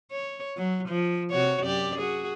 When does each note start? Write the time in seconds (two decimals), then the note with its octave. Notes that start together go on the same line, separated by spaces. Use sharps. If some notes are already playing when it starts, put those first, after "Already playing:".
0.11 C#5
0.57 F#3
0.88 F3
1.31 C3 F#4 C#5
1.63 F#2 G4 D5
1.98 F#4 G#4